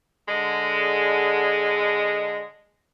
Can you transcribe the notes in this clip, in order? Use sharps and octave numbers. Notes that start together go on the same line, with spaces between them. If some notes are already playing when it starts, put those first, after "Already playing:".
D3 G#3